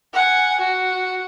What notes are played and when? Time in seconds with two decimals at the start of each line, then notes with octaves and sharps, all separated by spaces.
0.13 F#5 G#5
0.60 F#4